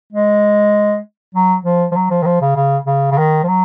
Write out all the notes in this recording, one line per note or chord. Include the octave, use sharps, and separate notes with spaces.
G#3
F#3
F3
F3
F#3
F3
D#3
F3
C#3
C#3
C#3
C#3
D#3
F3
F#3